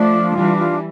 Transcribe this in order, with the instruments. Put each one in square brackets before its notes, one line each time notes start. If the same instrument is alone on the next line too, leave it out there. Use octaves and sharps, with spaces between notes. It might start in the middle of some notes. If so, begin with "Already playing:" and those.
Already playing: [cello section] F3 A3 [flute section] D4
[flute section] F4
[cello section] E3 G3 [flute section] D4
[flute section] F4